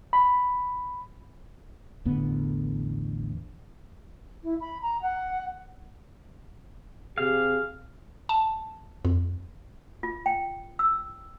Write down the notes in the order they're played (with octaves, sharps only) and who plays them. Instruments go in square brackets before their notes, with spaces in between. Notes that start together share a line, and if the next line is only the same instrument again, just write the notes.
[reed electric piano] B5
[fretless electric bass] A1 E2 D3 B3
[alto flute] E4
B5
A#5
F#5
[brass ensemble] C3 G4 G#4 [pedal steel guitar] F5
[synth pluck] A5
F2
[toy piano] F4
G5
E6